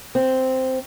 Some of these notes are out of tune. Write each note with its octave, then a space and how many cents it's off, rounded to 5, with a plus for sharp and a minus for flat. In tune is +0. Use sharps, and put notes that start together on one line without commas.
C4 -5